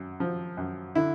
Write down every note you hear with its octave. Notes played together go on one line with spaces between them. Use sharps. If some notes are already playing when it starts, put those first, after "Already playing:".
Already playing: F#2
F3
F#2
D3 E4